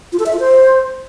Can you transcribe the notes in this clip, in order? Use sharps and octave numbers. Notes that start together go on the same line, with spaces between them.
F4
A4
E5
F4
C5